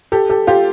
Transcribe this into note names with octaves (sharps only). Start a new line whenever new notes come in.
G4 A4
G4 A4
F4 G4